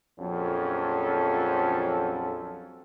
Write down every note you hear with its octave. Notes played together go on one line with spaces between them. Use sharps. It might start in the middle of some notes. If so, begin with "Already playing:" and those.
A#1 F2 F3 F#3 C#4 A4